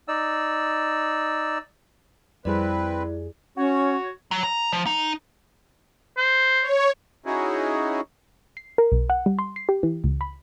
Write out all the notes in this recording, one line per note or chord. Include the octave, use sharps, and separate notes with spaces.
D#4 D5 E6
F2 G3 C4 E4 G#4 B4 D5
C#4 F#4 C#5
F#3
A#5
F3
D#4
C5
C#5
C#4 D#4 E4 F#4 G#4
C7
A#4
B1
F#5
G3
C6
C7
G4
E3
C#2
B5